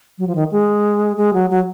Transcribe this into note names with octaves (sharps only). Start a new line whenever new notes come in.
F#3
F3
D#3
G#3
G#3
F#3
F#3